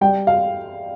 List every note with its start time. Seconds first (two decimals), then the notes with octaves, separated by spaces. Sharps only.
0.01 G3 G5
0.27 F5